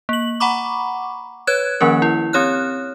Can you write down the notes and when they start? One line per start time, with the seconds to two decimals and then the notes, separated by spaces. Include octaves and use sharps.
0.09 A#3 F#7
0.40 F#5 A#5 B5 C#6 D6
1.47 B4 C#5 F#6 G#6
1.81 D#3 F3 A#3 C#4 A#4
2.02 E4
2.33 C4 G4 C#5 F6 F#6